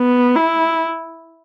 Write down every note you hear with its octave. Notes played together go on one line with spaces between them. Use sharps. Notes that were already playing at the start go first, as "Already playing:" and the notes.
Already playing: B3
E4